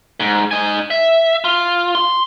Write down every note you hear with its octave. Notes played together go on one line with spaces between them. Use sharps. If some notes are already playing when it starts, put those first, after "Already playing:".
G#2
D#4 G#5
E5
F4
C6